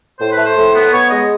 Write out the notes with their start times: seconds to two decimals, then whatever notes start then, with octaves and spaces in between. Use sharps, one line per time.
0.19 A2 C5
0.32 B4
0.38 A3
0.45 C5
0.56 A2
0.74 B3
0.92 B3 C#5
1.10 G#3 D#5